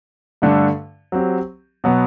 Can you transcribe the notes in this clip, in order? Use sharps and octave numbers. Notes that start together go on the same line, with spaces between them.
G2 D3 A3 D4
F#3 C4 G4
B2 F#3 B3